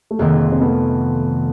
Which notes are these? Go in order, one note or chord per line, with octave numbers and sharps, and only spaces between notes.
A3
F1 F2 C3 D#3 G#3 A#3
C4
A3 B3